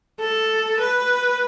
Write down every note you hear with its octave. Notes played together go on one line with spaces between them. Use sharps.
A4
B4